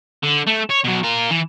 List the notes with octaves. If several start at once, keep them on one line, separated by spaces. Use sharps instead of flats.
D3
A3
C#5
B2 F#3
F4 A#4
E3